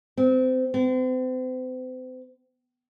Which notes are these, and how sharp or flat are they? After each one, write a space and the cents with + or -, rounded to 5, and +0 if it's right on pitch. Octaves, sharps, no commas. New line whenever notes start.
C4 -25
C4 -40